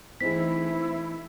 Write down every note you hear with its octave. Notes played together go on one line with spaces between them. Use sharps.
E3 A3 C4 D#4 E4 G#4 B6